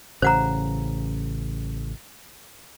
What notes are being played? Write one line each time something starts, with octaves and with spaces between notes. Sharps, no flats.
A1 C#3 C5 F#5 A#5